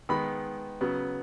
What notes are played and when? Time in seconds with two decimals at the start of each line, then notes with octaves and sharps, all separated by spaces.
0.09 D#3 G#3 B3 B5
0.81 C#3 F#3 B3